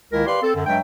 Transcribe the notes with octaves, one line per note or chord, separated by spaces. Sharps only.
C#2 D#3 G#3 A#3 E4 A#4
G4 B4 D5 F5 C6
C4 A4
F#2 D3
G2 F#3 G#3 E5 G5